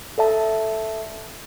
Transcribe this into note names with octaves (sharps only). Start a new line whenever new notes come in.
A4 D5 E5 A5